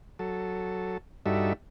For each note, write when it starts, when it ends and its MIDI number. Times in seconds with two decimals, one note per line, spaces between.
0.19 0.98 54
0.19 0.98 69
1.26 1.53 43
1.26 1.53 55
1.26 1.53 63
1.26 1.53 66
1.26 1.53 69
1.26 1.53 76